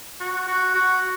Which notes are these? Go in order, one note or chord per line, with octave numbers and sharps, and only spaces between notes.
F#4
F#4
F#4